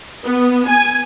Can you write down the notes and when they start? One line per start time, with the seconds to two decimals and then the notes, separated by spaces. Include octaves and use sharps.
0.24 B3
0.68 G#5